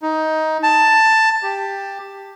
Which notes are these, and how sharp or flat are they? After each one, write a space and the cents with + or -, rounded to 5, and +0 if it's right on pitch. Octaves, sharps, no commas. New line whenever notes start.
D#4 +15
A5 +10
G4 +10